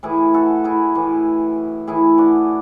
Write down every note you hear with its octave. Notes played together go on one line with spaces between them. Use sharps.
A2 E3 E4 G#4
F#4 A4
E4 G#4
A2 E3
A2 E3 E4 G#4
D4 F#4